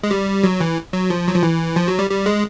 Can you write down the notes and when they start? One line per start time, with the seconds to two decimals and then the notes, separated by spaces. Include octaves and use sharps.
0.03 G#3
0.11 G3
0.44 F#3
0.60 E3
0.93 F#3
1.10 F3
1.27 F#3
1.35 F3
1.43 E3
1.76 F3
1.88 F#3
1.99 G3
2.10 G3
2.26 G#3